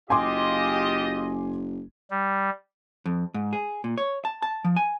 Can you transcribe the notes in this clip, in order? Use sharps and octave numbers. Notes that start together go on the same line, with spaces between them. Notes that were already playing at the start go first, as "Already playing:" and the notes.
F#1 F4 G4 D#5 G#5 C6 D6
G3
F2
G#2
G#4
A#2
C#5
A5
A5
F3
G#5